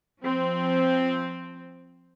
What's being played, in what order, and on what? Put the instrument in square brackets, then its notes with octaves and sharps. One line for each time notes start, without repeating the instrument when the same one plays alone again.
[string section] F3 C4